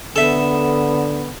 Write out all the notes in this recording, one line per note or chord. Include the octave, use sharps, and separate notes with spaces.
D3 B3 A4 E5